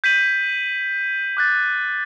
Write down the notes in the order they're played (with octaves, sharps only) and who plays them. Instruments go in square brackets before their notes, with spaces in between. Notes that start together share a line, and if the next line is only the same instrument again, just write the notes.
[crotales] G6 B6 D#7 F#7
D6 F#6 A6